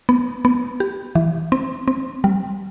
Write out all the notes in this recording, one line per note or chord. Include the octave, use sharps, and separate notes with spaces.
B3
B3
G4
E3
C4
C4
G3